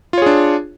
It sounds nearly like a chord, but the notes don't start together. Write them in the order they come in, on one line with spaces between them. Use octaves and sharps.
F4 C#5 G#4 D4